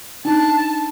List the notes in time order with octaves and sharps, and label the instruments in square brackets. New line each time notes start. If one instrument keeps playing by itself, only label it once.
[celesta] D4 D#4 [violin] A5